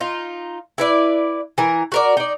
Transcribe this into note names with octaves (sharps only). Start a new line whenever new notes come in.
D#4 F4
E4 B4 D5
E3 A#4
F#4 A#4 D5
D#4 D5